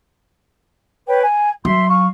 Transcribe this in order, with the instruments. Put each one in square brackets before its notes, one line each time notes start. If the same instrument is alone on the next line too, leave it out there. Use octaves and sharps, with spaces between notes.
[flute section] B4 C#5 G5
G#5
[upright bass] F#3 [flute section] E5 C6
[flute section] F5 C#6